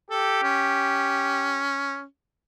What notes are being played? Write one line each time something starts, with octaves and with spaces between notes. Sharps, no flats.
G4 A4
C#4